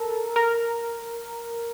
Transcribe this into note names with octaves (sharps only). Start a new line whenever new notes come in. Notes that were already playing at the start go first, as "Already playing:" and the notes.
Already playing: A4 A#4
A#4